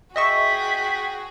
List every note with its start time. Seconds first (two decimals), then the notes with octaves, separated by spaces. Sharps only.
0.16 F#4 G#4 D#5 E5 G5 C#6 B6